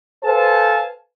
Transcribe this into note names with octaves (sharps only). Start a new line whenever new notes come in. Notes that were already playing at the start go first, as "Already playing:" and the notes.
A4 B4 C5 F5 G#5 A5